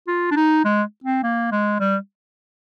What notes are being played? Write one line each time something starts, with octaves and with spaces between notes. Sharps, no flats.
F4
D4
D#4
G#3
C4
A#3
G#3
G3